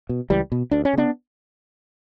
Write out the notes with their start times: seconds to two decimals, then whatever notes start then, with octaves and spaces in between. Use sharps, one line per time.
0.09 B2
0.30 C#2 E3 G3
0.52 B2
0.71 D2 D4
0.85 C#4
0.93 C#3 B3 D4